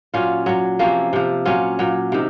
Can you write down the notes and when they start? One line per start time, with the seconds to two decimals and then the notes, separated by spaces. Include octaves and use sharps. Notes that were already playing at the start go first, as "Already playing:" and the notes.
0.14 A#2 F#3 C#4 F4
0.46 A#2 F#3
0.79 C3 F3 A#3 C#4
1.13 C3 F3
1.45 A#2 F#3 C#4 F4
1.79 A#2 F#3
2.12 C3 D#3